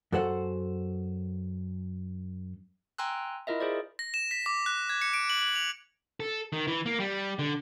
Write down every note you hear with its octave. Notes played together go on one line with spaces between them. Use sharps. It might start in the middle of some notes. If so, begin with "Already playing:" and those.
F#2 F#4 A4 C5 F#5
G5 G#5 A#5 C6 E6 F#6
E4 F4 A#4 D#5 E5
G#4 C5 D5
A#6
E7
B6
D6
F#6
G#6
C#7
D7
F#7
F#7
F7
A4
D#3
E3
A#3
G3
D3